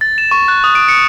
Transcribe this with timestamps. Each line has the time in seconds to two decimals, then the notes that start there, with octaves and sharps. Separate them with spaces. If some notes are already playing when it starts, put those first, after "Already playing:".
0.01 A6
0.18 E7
0.31 C#6
0.48 F#6
0.64 D#6
0.75 D7
0.88 C#7